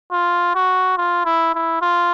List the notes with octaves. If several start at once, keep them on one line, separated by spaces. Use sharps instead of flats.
F4
F#4
F4
E4
E4
F4